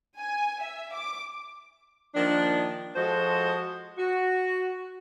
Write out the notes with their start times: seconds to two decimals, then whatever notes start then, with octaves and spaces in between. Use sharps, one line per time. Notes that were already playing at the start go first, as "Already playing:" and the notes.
0.18 G#5
0.62 E5
0.93 D6
2.15 D#3 F3 A#3 D4
2.96 F3 G#3 F#4 A4 C5 D#5
3.98 F#4